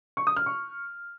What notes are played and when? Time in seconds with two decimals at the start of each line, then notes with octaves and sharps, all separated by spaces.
0.17 C#6
0.27 D#6
0.36 F6
0.46 C#6